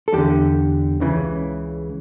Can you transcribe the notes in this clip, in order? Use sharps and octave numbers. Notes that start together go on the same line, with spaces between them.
A4
E2 D3 G4
C#2 C#3 E3